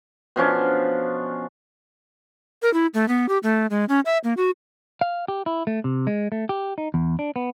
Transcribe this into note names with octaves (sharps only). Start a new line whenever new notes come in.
B2 F3 C#4 D4
A#4
E4
A3
B3
G4
A3
G#3
C#4
E5
A#3
F#4
F5
G4
E4
A3
C3
G#3
A3
G4
D#4
E2
D4
B3